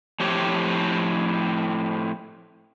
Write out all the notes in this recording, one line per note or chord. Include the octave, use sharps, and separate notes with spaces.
A2 F3 C4 G4 C#5